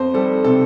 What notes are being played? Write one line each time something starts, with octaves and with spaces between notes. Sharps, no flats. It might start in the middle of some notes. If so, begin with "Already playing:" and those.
Already playing: F2 C5
G3 A4
C3 A4